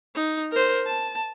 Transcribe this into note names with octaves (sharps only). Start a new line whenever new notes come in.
D#4
A#4 C5
A5